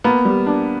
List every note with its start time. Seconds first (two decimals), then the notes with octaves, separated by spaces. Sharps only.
0.04 A#3 B3
0.25 G3
0.47 D4